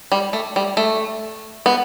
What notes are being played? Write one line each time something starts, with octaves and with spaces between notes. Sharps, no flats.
G3
A3
G3
A3
B3